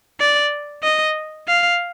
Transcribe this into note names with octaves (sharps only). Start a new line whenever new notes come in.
D5
D#5
F5